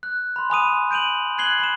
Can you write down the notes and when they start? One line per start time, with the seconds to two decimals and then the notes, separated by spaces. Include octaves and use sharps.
0.03 F#6
0.36 B5 C6
0.50 G#5 B5 D#6 D#7
0.91 G6 D7 D#7 F7 F#7
1.38 F#6 G#6 C7 F#7 G7
1.59 B5 E7